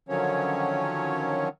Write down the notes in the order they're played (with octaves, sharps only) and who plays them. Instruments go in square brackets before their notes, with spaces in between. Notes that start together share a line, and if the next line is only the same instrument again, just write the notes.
[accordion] D3 D#3 F3 F#3 C#4 C#5